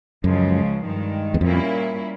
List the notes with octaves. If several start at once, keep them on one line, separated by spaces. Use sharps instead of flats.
C#2 F#2 C#3 F3 G#3
G2 D#3 G#3
E2
F2 A#2 G3 A#3 C#4 E4